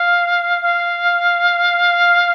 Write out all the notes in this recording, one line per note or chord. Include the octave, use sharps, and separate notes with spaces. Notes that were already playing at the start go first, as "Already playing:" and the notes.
Already playing: F5
F5